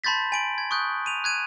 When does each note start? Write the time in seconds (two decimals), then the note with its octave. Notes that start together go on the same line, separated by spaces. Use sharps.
0.04 A5 B5 C6 G6 A6 B6
0.32 G#5 D7 F#7
0.58 G#6
0.71 C#6 D#6 F#6 G6
1.06 D#7 F7
1.24 F#6 G#6 D#7